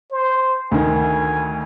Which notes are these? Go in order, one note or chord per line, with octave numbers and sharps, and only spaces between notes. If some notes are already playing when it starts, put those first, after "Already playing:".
C5
D2 D#3 G#5